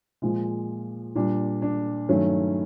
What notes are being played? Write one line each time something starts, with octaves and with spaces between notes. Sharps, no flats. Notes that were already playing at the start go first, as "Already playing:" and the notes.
A#2 F3 G#3
A#2 G3 D4
D4
G2 D#3 F#3 A3 C#4